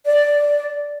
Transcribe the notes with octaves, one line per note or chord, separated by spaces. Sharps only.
D5